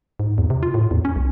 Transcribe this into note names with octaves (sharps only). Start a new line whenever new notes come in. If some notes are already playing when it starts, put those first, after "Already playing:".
G#2
E2
C3
F4
A2
E2
C#4
B1